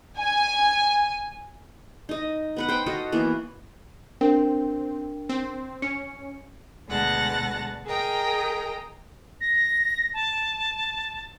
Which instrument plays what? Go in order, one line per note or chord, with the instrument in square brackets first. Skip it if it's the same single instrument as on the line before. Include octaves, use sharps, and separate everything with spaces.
[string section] G#5
[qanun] D#4 D#5
B3 B4 F#5
C5 G5
F#4 A4 D#5 F5
E3 A#3 B3
[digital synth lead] C4 [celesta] D4 A#4 G5
[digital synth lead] C4
[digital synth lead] C#4 [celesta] C#7
[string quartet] D2 B2 G#3 F#5 A5 A#6
G#4 A#4 D#5 G5 A#5
[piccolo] A#6
A5